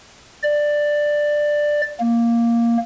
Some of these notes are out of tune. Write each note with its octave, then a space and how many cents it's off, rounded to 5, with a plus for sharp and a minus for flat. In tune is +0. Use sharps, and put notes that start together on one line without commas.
D5 +10
A#3 +0